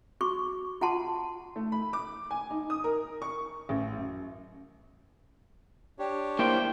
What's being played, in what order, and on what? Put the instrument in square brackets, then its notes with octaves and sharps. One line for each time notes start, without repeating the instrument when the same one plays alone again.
[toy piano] F#4 C#6 D6
F4 F#5 A5 C6
[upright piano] A3
B5
D6
G#5
D#4
D#6
A#4
C#6
A1
F#2
[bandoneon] D4 G4 C#5
[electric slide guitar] A#3 E4 C5 [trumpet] G5